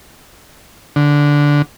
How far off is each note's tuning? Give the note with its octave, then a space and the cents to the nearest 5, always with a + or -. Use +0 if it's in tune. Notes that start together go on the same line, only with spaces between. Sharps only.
D3 -10